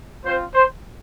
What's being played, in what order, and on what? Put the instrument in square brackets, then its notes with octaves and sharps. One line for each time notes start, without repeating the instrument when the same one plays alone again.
[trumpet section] C4 F4 C5
C5